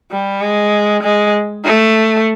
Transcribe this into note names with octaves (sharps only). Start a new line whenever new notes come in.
G3
G#3
G#3
A3